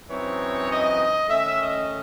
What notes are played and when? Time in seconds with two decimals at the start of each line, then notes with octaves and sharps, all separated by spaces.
0.09 F#2 E3 C4 D#4 C#5
0.69 D#5
1.28 D#3 A3 C#4 E5
1.59 D#5